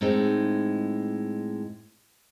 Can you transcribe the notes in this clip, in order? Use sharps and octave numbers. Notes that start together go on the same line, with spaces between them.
A2 G#3 C4 D#4